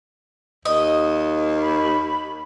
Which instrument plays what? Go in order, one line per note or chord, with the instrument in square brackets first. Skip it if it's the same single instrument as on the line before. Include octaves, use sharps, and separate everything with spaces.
[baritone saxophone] D#2 [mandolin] D#5
[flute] B5